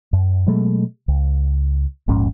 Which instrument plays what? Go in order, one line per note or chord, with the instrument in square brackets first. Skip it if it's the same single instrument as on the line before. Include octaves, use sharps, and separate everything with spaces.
[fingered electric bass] F#2
B2 F#3 G#3 A3
C#2
D#1 A#1 G#2 C#4